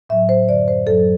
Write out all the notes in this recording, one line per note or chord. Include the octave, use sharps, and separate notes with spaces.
A2 F#3 E5
C5
F#2 D3 F#3 D5
C5
F#2 D3 F#3 A4